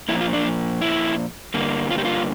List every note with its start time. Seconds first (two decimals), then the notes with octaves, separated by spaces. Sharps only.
0.08 A#2 F3 A#3 E4
0.21 F4
0.33 D4
0.81 E4
1.54 G2 D3 G3 A#3
1.91 F4
1.98 G4
2.05 F4